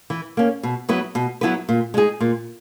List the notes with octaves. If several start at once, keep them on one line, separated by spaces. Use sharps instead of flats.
E3
A#3 C#4
B2
F#3 B3 E4 B4
B2
F#3 B3 E4 B4
A#2
G#3 D#4 G#4
A#2